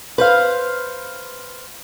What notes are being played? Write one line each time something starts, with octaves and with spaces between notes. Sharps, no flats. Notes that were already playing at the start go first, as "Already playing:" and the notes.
B4 C5 F5